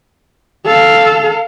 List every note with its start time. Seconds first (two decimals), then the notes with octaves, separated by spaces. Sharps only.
0.65 A4 F5